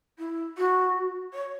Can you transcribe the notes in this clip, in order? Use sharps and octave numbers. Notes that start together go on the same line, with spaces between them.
E4
F#4
C#5